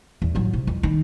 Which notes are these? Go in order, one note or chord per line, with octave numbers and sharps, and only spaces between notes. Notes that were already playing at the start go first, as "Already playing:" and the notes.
E2
A1 F#3
C3
F2
D#3